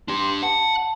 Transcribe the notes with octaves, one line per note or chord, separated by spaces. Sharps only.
D4 G4 C6
F#5 A5